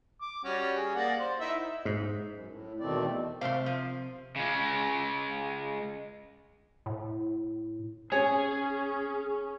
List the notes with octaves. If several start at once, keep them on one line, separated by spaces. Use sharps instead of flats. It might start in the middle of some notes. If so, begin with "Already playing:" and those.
D6
G3 C#4 F#4
G#4
A#3 D5 F#5
C5
D#4 E4 E5
G#2
F#2
A2
E2 B2 D#3 A3 C4 D5
C3 A3 A#4 F5 C6
F3
C#3 G#3
A2
C#4 G#4 C#5 G#5